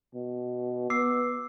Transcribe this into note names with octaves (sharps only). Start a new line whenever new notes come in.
B2
B3 D6 E6 C7